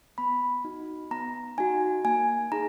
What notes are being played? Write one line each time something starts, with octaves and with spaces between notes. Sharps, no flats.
B3 B5
D#4 F#4
B3 A#5
D#4 F#4 G#5
A#3 G#5
D#4 G#4 A#5